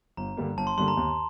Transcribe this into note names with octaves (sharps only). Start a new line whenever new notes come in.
G1 A#5
G2 D3 G3 A#3
G1 A5
C6
G2 D3 G3 A#3 C6
A#5
D#2